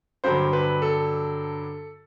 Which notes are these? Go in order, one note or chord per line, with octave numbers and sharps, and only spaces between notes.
G2 D3 F#3 C5
B4
A4